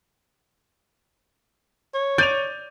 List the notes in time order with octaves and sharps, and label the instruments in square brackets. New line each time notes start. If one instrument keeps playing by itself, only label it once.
[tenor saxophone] C#5
[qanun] D5 [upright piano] G6 D#7 F7